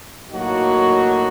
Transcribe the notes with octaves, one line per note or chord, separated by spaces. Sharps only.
A2 F#3 A#3 D#4 F#4